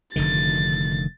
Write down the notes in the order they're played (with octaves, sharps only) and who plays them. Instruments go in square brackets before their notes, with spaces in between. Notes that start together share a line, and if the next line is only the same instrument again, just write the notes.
[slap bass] F1 D3 D#3 [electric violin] A6